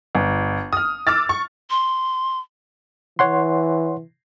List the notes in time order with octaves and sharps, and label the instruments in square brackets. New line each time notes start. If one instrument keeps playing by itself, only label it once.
[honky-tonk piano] G1
D#6 F6
D6 E6 F6 A6
C#6
[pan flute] C6
[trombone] E3 [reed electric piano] C#5 F#5 C6